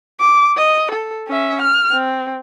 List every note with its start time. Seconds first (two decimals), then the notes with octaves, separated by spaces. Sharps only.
0.20 D6
0.57 D#5
0.92 A4
1.28 C#4 E5
1.62 F6
1.92 C4